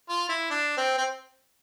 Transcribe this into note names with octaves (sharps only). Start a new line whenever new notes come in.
F4
E4
D4
C4
C4